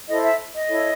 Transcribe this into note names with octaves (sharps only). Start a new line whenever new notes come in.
E4 A4 C5 D#5
E5
D#5
E4 A4 C#5